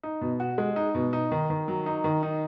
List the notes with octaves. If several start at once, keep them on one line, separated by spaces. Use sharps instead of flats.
D#4
B2
F#4
G#3
D#4
B2
D#4
D#3
D#3
F#3
D#4
D#3
D#4